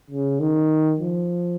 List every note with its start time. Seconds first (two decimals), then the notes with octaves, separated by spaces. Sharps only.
0.10 C#3
0.40 D#3
1.00 F3